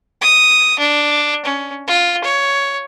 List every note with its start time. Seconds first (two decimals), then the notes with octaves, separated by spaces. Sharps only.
0.22 D#6
0.79 D4
1.45 C#4
1.88 F4
2.24 C#5